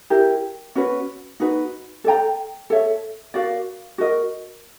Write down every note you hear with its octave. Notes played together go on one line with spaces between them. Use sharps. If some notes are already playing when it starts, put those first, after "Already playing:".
E4 G4 A#4
C#4 F#4 B4
D#4 F#4 B4
A4 D5 G5 A#5
A4 C#5 E5
F#4 A#4 D5 F5
F#4 A#4 D#5